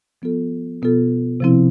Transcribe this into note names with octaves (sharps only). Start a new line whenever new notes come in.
F3 B3 F4 A4
B2 B3 F4 A4
C3 F3 C4 E4